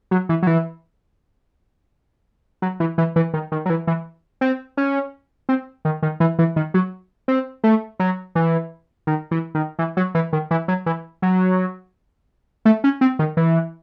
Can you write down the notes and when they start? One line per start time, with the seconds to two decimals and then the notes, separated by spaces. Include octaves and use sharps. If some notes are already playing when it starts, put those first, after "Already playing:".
0.11 F#3
0.29 E3
0.42 F#3
0.47 E3
2.62 F#3
2.80 E3
2.98 E3
3.16 E3
3.34 D#3
3.52 D#3
3.66 F#3
3.70 E3
3.87 E3
4.41 C4
4.77 C#4
5.49 C4
5.85 D#3
6.02 D#3
6.20 E3
6.39 E3
6.56 D#3
6.74 F#3
7.28 C4
7.64 A3
8.00 F#3
8.35 E3
9.07 D#3
9.31 E3
9.55 D#3
9.79 E3
9.97 F#3
10.15 E3
10.33 D#3
10.51 E3
10.68 F#3
10.86 E3
11.22 F#3
12.65 A3
12.84 C#4
13.01 C4
13.19 D#3
13.37 E3